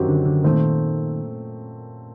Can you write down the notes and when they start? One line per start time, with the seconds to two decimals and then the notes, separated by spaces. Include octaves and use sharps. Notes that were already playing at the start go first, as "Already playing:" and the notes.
Already playing: F#2 D#3 F#3 C4 G4
0.08 D3
0.26 D3
0.44 A#2 D#3 A3 C4